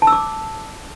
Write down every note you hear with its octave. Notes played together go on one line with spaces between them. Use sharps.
A5
E6
D6